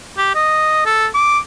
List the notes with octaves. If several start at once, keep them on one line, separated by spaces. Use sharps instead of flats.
G4
D#5
A4
D6